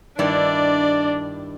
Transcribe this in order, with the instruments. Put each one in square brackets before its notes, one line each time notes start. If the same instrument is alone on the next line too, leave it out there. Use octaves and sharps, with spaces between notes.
[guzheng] G2 D#3 E4 [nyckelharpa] D4 [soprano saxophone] D5